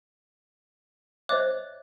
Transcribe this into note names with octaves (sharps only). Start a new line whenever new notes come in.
C5 C#5 D#5 E5 D6 F#6